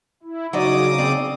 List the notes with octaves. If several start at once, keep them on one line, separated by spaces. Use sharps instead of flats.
E4
C#3 F#3 D#4 D5 D6 D#6
C4 D5